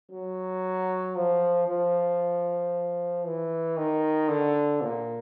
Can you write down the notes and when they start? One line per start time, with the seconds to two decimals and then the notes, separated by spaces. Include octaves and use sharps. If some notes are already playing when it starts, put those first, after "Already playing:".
0.11 F#3
1.15 F3
1.68 F3
3.25 E3
3.77 D#3
4.29 D3
4.81 A#2